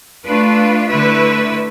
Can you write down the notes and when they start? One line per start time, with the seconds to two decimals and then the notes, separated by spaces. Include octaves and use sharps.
0.25 A3 D4 F4 B4
0.88 D3 A3 E4 B4 E5